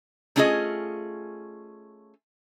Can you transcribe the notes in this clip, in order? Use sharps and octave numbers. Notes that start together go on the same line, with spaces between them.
A3 C#4 D4 F4 G#4 D#5